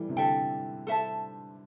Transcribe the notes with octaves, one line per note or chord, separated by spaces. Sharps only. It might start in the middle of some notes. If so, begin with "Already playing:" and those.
Already playing: E3 G3 A3
C3
D3 A4 E5 G5
A4 C5 E5 A5